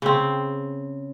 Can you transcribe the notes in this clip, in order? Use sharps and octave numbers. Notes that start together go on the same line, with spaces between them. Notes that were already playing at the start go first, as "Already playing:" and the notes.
C#3 C4